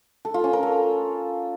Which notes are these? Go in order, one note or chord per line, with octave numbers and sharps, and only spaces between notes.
A4
F4
C#4
A#4
A4